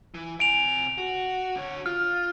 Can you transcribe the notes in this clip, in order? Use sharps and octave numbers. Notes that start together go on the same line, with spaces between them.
E3
C3 G#5 D7 F7
F#4
D3 C#5
F4 F6